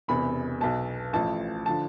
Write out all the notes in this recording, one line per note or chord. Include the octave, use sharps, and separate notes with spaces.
E1 E2 C3 B5
B1 B2 A5
A1 A2 F3 A5
D3 F3 A5